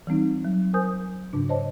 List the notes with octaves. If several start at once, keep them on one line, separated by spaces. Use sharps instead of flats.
E3 G3 C4 D#4
F#3
A#4 C5 G#5 D#6 G6
G#2 C#3 D4
C5 C#5 D#5 A5